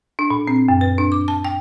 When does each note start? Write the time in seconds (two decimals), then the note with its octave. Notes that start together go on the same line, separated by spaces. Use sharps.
0.19 D4
0.30 A#2
0.48 C4
0.68 F#2
0.81 B4
0.98 D4
1.12 D6
1.28 A5
1.45 G5